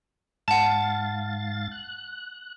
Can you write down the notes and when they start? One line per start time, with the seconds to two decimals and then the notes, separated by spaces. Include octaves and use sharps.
0.48 G#2 F5 F#5 A5 A6
1.72 F#6